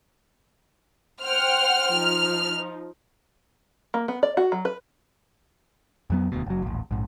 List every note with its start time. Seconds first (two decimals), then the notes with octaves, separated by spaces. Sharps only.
1.23 C5 F#5 G5 F6
1.95 F3 D#4
3.94 A#3
4.08 B3
4.23 D5
4.37 F#4
4.52 F#3
4.65 B4
6.10 F2 F#3 B3
6.32 D#1 D2 B2
6.46 F#1 F#3
6.62 D#1 A1
6.91 A#1 G#2